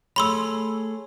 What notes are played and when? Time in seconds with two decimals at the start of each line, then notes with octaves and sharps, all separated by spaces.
0.16 A3 G#4 C#5 B5 C6 E6